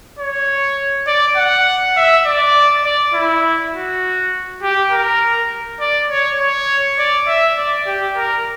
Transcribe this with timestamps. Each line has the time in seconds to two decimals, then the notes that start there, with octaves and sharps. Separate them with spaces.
0.19 C#5
1.07 D5
1.36 F#5
1.97 E5
2.26 D5
2.84 D5
3.14 E4
3.73 F#4
4.63 G4
4.92 A#4
5.80 D5
6.10 C#5
6.40 C#5
6.99 D5
7.27 E5
7.57 D5
7.87 G4
8.16 A#4